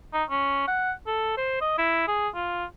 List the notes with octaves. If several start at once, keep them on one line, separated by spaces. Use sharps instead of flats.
D#4
C#4
F#5
A4
C5
D#5
E4
G#4
F4